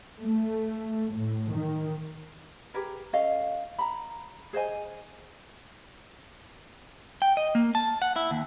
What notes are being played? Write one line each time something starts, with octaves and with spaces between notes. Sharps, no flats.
A3
A2
D#3
G4 G#4 A#4 B4
C#4 A4 D#5 F5
A#5 B5
G#4 C5 D#5 G#5
G5
D#5
A#3
A5
F#5
E4
D#2